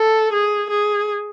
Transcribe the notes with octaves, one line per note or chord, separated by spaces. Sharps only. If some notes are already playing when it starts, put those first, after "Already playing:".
Already playing: A4
G#4
G#4